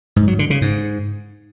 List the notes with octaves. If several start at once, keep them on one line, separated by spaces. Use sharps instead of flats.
G#2
F#3
D3
C#3
G#2